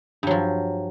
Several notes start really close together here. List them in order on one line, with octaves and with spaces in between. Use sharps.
G2 F#3 F3